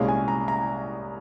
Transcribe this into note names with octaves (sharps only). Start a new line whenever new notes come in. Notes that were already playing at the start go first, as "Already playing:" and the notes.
Already playing: C2 A#2 G#3 C#4 F5
G#5
A#5
A#5